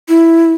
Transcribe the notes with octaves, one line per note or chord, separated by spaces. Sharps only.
E4